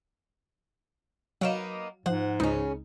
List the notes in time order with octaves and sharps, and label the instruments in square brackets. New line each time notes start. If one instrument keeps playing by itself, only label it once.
[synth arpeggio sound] F#3 F5 E7 [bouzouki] A#3 B3 D#4
[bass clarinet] G#2 [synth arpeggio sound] F3 C5 [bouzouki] F#5
[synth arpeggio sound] C#2 D#4 [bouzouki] C#3 C#4